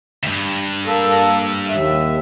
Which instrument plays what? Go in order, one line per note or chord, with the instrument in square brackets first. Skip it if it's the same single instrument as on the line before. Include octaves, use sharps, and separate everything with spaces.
[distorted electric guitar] D2 G2
[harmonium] A#3 A4
D#2 E5